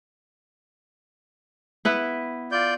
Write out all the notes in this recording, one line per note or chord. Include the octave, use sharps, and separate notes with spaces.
B3 E4 B4
F4 D5 G6